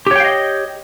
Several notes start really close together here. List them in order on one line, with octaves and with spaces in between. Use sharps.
G4 C#5 G5 F5 D#5